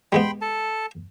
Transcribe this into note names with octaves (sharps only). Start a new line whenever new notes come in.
G3 G#3 B3 G5 B5 C6
A4 A5